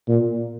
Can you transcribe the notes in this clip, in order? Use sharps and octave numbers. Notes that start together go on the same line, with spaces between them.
A#2